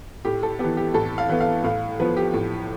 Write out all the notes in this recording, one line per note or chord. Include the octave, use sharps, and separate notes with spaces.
A2 G4
A4
E3 B3 G4
G4
A2 A4
F5
E3 B3
F5
A2 F5
F3 B3 B4
G4
A2